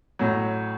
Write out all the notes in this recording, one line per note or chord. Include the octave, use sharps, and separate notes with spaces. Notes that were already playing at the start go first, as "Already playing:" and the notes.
A1 A2 F#3